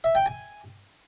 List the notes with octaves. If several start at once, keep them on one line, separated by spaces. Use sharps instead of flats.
E5
G5
G#5